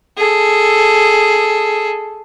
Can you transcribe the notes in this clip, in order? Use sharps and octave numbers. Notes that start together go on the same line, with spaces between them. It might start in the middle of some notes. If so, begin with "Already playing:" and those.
G#4 A4